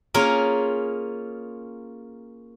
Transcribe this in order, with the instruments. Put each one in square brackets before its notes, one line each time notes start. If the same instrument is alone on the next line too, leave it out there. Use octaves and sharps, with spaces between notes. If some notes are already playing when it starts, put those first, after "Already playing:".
[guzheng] A#3 C#4 F4 G#4 A#4